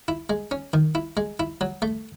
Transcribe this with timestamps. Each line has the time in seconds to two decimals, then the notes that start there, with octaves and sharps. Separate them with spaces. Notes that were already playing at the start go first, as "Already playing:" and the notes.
0.08 E4
0.30 G#3
0.51 C#4
0.74 D#3
0.95 E4
1.17 G#3
1.40 E4
1.61 F#3
1.82 A3